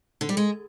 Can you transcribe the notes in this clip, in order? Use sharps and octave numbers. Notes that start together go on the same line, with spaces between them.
D3
G3
G#3